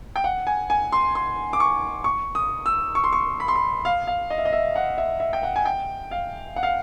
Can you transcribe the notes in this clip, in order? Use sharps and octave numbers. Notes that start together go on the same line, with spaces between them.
G5
F#5
G#5
G#5
C6
C6
D6
C#6
C#6
D#6
E6
C#6
C6
C#6
B5
C6
B5
F5
F5
D#5
E5
D#5
E5
F#5
E5
E5
G5
F#5
G#5
G5
F5
F#5
F5